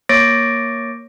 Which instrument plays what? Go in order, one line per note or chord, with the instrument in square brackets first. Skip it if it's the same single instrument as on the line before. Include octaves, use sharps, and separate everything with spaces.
[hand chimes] A#3 C#5 D6 A6 A#6 D7